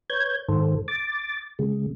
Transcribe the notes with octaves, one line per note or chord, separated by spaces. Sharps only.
B4 C#5 G6 G#6
G#2 D#3 A4 C5
D6 A6
C#3 G#3